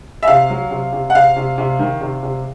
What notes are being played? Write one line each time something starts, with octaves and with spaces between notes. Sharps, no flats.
E5
C3 F5
F#3
C3
C3
F#5
C3 F5
C3
C3
D#3
C3
C3